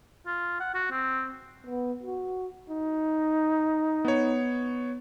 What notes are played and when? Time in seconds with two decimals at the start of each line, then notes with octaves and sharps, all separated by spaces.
0.27 F4
0.60 F#5
0.75 F#4
0.91 C4
1.67 B3
2.03 F#4
2.70 D#4
4.05 B3 C#5